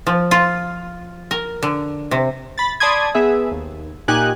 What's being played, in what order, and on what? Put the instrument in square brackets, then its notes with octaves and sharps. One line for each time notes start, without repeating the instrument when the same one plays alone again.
[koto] F3
F4
A#4
D3
C3
[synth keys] B5 A6
D5 A5 B5 C6 D#6 G#6
B3 G#4 E5
D#2
A#2 D#4 G4 G#5 F#6